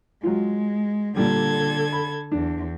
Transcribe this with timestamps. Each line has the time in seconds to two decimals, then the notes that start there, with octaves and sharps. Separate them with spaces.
0.23 F#3 G#3 F4
1.16 A#2 D3 G3 A4 G#6
1.93 B5
2.32 E2 D4